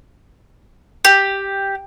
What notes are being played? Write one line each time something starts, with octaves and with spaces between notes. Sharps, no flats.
G4